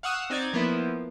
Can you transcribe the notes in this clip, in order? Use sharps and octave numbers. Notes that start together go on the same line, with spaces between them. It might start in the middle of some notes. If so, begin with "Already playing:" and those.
F5 F#5 C#6 D#6 E6 F#6
C4 D#4 D5 G#6 A6
F3 A#3 B3 E4